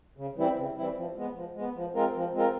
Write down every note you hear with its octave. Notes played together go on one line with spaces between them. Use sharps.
C#3
E3 G3 C4 E4
C#3
E3 G3 C4 E4
F3
G#3 B3
F3
G#3 B3
F3
G#3 C4 F4 A#4
F3
G#3 C4 F4 A#4